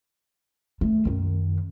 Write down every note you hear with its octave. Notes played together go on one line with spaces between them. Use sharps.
A3
F#2 D#3